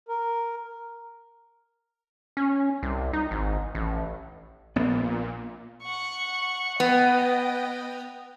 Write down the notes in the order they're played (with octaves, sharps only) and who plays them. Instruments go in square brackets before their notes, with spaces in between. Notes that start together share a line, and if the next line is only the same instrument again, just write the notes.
[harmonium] A#4
[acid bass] C#4
C2
D#4
G#1
A1
[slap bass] A#1 B3 [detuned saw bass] A#2
[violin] F#5 C#6
[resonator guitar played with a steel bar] B3 [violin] D#5 G5